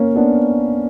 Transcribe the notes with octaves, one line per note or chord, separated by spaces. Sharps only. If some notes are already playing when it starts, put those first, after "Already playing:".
Already playing: A#3 C#4
B3 D4